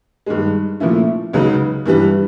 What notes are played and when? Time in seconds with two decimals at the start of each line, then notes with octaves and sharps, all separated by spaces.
0.26 G2 D#3 G#3
0.80 A#2 F3 A3 C#4 E4
1.33 C#2 C#3 F#3 B3 D#4
1.86 G2 E3 G3 B3 D4